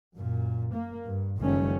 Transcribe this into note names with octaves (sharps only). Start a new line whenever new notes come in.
F#2 A#2
A#3
G2
F#1 D#3 F3 G3 A3 C#4